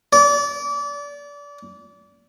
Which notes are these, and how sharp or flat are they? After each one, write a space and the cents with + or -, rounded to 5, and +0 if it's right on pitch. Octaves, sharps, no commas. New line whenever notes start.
D5 -30